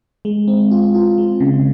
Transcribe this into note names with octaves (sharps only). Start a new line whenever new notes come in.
G#3
C4
F4
F4
G#3
C#3